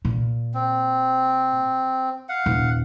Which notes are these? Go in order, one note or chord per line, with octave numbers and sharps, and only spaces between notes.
A#2
C4
F5 F#5
D#1